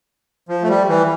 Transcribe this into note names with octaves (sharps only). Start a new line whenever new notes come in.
F3
A3
G3
E3